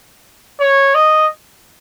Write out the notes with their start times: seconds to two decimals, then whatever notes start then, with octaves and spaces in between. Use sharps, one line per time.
0.60 C#5
0.95 D#5